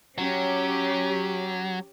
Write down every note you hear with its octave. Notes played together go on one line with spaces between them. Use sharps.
F#3 C#4 G4